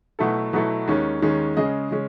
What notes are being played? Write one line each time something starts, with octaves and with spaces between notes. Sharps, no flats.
B2 F#3 A3 E4 A4
B2 F#3 A3 E4 A4
D#2 D#3 G#3 C#4
D#2 D#3 G#3 C#4
C#3 G#3 C#4 G#4 D#5
C#3 G#3 C#4